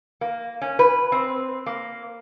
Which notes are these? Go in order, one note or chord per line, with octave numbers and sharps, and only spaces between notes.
A#3
C#4
B4
C4
A#3